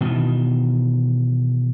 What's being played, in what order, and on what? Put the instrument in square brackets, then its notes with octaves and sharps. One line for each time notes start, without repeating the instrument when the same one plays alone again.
[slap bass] B2 D#3 E3